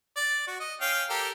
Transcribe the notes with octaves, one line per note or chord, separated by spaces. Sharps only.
D5
F#4
D#5
C#4 F5 G5
G4 A4 A#4